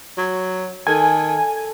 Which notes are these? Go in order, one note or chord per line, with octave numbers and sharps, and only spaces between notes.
F#3
D#3 A4 G#5